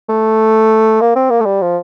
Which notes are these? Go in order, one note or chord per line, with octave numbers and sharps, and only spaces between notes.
A3
A#3
C4
A#3
A3
G3
F3